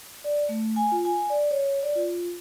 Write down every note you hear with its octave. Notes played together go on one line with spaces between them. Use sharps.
D5
A3
G#5
F4
G#5
D5
C#5
D5
F4